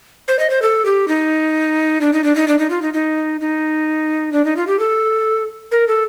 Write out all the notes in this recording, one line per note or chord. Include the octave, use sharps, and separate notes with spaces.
C5
D#5
C5
A4
G4
D#4
D4
D#4
D4
D#4
D4
D#4
F4
D#4
D#4
D#4
D4
D#4
F4
G4
A4
A#4
A4